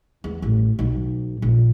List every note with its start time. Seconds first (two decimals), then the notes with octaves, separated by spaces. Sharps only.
0.24 E2
0.42 A1
0.79 B1
1.42 A#1